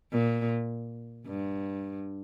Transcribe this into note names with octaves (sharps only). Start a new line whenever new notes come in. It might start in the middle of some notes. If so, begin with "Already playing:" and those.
A#2
G2